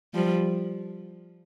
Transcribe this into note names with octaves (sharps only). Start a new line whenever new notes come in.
F3 G3